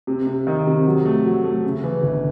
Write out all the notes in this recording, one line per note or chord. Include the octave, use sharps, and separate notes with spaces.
C3
C3
D#3
C3
F#3
A3
F#3
A3
C#3
E3
G1